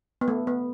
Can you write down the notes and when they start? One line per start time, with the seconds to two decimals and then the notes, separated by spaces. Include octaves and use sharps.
0.21 B3
0.28 A3
0.47 B3